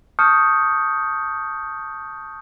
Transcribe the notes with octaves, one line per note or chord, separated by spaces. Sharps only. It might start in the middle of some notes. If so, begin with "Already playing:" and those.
A5 C#6 D#6 F6 G6 C#7